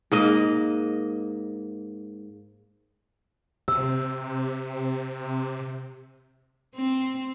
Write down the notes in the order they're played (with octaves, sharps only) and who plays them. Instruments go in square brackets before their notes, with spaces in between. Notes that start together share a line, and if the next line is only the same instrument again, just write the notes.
[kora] G#2 A#3 D#5
[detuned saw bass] C3 [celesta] E6
[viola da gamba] C4